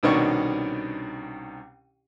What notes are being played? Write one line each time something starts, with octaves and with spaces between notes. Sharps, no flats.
C2 B2 D#3 C#4 D4 C#6